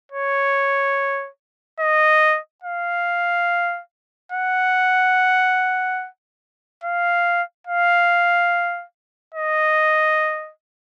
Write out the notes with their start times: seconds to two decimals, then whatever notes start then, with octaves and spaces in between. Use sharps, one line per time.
0.12 C#5
1.80 D#5
2.64 F5
4.32 F#5
6.84 F5
7.67 F5
9.34 D#5